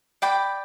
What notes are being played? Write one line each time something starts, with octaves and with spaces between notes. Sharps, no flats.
D5 G5 B5 D6